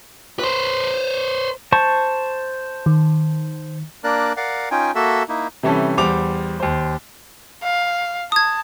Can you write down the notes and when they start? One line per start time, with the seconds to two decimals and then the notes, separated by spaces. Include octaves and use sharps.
0.39 B4 C5
1.72 C5 A5 C#6
2.86 D#3
4.04 A#3 D4 A#4 D5 F#6
4.37 A#4 D5 F5 F#5
4.71 C#4 D#4 F4 G5 G#5
4.95 A#3 F#4 A4 E5
5.29 A#3 D#4 E4
5.63 C3 E3 G3 C#4 A4
5.97 E2 G3 C5 D6 F7
6.60 D#2 C5
7.63 F5
8.32 A5 D#6 G#6